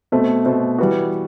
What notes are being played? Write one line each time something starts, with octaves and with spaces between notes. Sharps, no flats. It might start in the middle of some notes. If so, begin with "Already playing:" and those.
B2 A3 C4
B2 A3 C4
E3 G3 B3 F#4